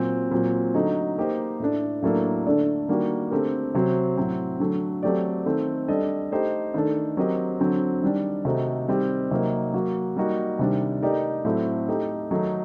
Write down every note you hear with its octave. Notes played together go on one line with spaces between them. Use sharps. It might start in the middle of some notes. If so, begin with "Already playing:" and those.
Already playing: A#2 F#3 C4
A#2 F#3 C4
D3 F#3 A3 D#4
A#3 D#4 G4 C5 D#5
A2 A3 D4
A2 F#3 A#3 D4 A4
D3 A3 D4 A4 D5
D#3 G3 A#3 D4 F#4
D3 A3 C4 G4 A#4
C3 F#3 C4 F#4 C5
A2 F#3 C4
D3 F#3 A3
F#3 A3 C4 G4 D5
D#3 A3 C4
G3 D4 A4 D#5
A3 D#4 G4 C5 D#5
D#3 A3 D4 A4
F#3 C4 G4 A#4 D#5
D3 F#3 C4
D#3 G3 D4
C3 D#3 A3 D#4 F#4
D#3 G3 C4 G4
C3 F#3 A#3 D#4
F#3 A#3 F#4
G3 A#3 D#4 F#4
C3 D#3 G3 D4
A3 D#4 G4 A#4 D5
A2 F#3 A3 C4 F#4
A3 D#4 G4
D#3 F#3 A3 D#4